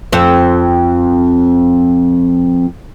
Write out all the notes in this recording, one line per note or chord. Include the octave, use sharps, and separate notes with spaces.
F2 C4